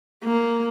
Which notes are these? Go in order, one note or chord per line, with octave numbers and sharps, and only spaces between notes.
A#3